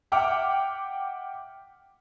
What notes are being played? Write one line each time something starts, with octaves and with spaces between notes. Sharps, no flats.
E5 F#5 G5 D6 F6